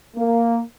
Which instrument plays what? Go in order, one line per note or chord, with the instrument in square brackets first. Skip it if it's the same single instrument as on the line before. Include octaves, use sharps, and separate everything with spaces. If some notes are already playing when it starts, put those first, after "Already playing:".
[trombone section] A#3